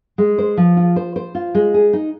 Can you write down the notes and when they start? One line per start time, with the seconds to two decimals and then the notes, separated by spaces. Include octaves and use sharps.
0.18 G#3
0.38 C5
0.57 F3
0.77 F4
0.96 C5
1.16 C5
1.35 F4
1.55 G#3
1.74 G#4
1.93 D#4